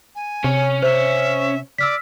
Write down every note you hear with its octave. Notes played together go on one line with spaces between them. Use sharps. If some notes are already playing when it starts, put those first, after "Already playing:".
G#5
C3 C#4 C#5
C5 E5
D5 E6 F6 B6